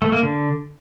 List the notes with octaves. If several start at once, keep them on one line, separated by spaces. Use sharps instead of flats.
A3
A#3
D3